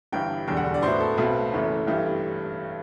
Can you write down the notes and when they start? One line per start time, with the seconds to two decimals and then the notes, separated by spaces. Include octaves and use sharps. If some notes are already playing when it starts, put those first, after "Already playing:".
0.12 G1 G2 E3 G5
0.48 E1 E2 D3 G3 G5
0.57 F#5
0.74 D5
0.82 A2 F#3 B3 E4 C5
1.00 A4
1.17 B1 B2 A3 C4 B4
1.53 F#1 F#2 E3 A3
1.87 A1 G2 E3 A3 G4